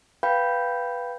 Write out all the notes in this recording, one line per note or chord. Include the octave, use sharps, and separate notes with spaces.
B4 F5 G5 B5 G6